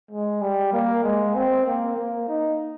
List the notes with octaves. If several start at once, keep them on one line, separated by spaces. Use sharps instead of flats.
G#3
G3
A#3
G#3
C4
A#3
A#3
D#4